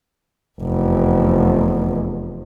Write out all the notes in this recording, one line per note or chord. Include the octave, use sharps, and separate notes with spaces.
F1 E2